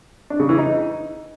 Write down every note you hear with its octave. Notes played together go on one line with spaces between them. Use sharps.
D4
C#3
E3
D#4